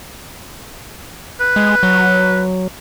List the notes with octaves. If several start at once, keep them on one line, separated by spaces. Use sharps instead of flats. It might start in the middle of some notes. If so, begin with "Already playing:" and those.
B4
G#3
F#3